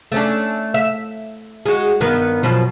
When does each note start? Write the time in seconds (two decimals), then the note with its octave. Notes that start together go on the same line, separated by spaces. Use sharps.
0.12 A3 C#4 D4
0.74 E5
1.66 G#3 F#4
2.01 G2 D#3 B3
2.43 F#2 B2 F3